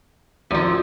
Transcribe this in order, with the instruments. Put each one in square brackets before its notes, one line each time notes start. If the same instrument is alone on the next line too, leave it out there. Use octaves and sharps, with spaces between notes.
[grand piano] D1 F#4 D5 [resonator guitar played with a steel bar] F#2 F3